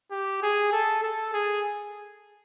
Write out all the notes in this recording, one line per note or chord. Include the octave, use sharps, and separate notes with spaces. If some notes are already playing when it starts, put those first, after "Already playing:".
G4
G#4
A4
A4
G#4